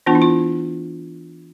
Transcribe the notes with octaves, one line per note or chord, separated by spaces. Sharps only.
E3 B3 D4 F4
E4
F4